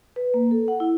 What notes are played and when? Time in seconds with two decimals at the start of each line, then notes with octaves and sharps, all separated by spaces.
0.16 B4
0.34 A#3
0.51 A4
0.68 F#5
0.80 E4